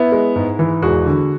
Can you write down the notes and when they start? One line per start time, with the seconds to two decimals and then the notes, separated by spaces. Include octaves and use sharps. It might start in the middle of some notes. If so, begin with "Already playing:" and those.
Already playing: B3 E4
0.12 G#3
0.36 G#2
0.59 E3
0.82 E1 F#4 G#4
1.06 D3